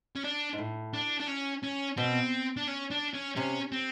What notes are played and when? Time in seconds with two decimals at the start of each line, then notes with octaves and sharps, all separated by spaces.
0.16 C#4
0.24 D4
0.53 G#2
0.58 A2
0.94 D4
1.20 D4
1.27 C#4
1.63 C#4
1.97 B2 C4
2.57 D4
2.67 C#4
2.91 D4
3.14 C#4
3.37 C3 C#4
3.72 C4